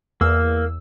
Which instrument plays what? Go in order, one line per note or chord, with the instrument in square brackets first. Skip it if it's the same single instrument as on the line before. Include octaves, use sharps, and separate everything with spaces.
[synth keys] E2 E6 [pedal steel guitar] A#3